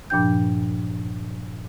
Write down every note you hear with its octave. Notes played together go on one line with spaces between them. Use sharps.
G2 A#2 F3 D4 G5 G6